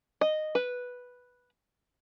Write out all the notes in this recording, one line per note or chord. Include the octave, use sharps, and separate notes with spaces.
D#5
B4